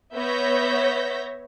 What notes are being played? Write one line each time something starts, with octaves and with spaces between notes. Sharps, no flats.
B3 C#5 E5 G6 A#6 B6